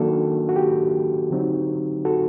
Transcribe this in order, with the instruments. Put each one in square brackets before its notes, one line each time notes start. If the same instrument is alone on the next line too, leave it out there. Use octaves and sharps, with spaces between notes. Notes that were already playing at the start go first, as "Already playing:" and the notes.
Already playing: [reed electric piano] D#3 F#3 A#3 D4 F#4 A4
F#4
G4
D3 F#3 C4 D#4
F#4 A4